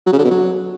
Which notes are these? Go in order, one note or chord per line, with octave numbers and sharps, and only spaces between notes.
F#3
C#3
D3
B2
F#3